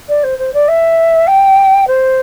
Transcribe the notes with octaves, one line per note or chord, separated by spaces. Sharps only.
D5
C5
C5
D5
E5
G5
C5